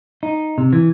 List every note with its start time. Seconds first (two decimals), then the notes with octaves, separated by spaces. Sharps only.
0.23 D#4
0.58 C3
0.73 E3